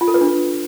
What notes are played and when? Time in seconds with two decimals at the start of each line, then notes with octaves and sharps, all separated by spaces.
0.01 F4
0.08 A4
0.14 B4
0.21 D4